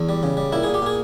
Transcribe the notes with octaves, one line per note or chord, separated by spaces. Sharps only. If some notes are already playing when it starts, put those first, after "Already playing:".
Already playing: E2
G3
C#3
G3
A#2 E4
A#2 G#4
G4
A#2 G#4